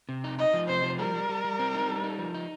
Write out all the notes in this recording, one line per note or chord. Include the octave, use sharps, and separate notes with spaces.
C3
D#4
D#4 D#5
F3
C3 C5
F3
G3 A#4
G3
G3
G3
C4
D#4
G3
D#4
F3
D#4